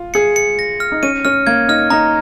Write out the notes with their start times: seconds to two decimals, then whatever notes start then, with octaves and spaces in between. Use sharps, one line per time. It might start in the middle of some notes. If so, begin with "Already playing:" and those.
Already playing: F4
0.14 G#4 C#7
0.36 C#7
0.59 A#6
0.80 F6
0.92 D#4
1.03 C#4 D#7
1.25 C#4 F6
1.47 A#3 G#6
1.69 D#4 F6
1.90 D#4 A#5